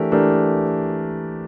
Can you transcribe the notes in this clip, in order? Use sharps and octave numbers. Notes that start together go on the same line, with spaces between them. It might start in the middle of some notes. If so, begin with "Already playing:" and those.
Already playing: E3 A3 D4 G4 A#4
E3 A3 D4 G4 A#4